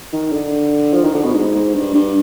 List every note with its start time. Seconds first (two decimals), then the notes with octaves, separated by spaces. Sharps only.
0.12 D#3
0.32 D3
0.93 F3
1.04 D#3
1.15 D3
1.24 B2
1.34 G#2
1.55 G#2
1.74 G2
1.94 G2